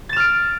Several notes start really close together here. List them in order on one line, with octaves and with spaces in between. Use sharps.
A6 E7 F6 D7